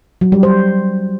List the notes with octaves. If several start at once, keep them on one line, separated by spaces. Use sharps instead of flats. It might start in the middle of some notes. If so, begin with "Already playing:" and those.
F#3
G3
C5